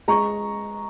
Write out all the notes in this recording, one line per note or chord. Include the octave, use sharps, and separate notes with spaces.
G#3 A#5 C#6